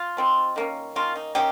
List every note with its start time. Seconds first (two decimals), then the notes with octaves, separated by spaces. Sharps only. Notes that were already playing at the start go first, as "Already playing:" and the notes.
Already playing: F4
0.17 F3 C4 D#4
0.56 D#3 A#3 C#4
0.96 D#3 A#3 C#4 F4
1.16 D#4
1.35 A#3 C#4 D#4 G4